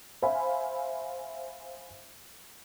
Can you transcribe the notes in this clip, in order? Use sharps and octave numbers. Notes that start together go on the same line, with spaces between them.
C5 E5 F5 G#5 B5